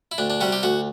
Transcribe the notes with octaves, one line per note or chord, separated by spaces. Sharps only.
E4
D2 D4
D4
C3 G3 F#4
G4
D2 F#4